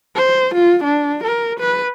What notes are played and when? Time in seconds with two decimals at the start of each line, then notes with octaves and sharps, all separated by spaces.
0.16 C5
0.54 F4
0.83 D4
1.23 A#4
1.59 B4